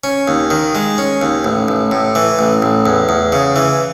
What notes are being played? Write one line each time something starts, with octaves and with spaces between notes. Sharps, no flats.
C#4
D#2
D#3
G#3
C#4
D#2
A1
A1
A2
E3
A1
A1
E2
E2
C#3
E3